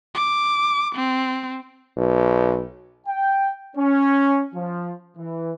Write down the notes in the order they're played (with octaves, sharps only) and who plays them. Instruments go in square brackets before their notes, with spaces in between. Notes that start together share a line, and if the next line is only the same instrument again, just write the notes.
[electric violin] D6
C4
[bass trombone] B1
[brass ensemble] G5
C#4
F3
E3